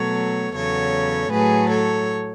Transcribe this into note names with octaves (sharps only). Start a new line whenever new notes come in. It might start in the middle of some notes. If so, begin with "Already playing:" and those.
Already playing: B2 F#3 A3 A4 C#5
E2 C#3 F#3 A4 C#5
A2 F#3 A3 G#4 B4
A4 C#5